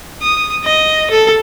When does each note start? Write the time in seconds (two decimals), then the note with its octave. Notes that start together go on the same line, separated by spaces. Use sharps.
0.22 D#6
0.64 D#5
1.11 A4